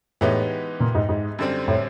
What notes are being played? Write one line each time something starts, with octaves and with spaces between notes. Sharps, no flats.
A2 E3 G#3 B3 D#4 G4
A#2
G#2
G#2
F#2 D3 G3 C4
A2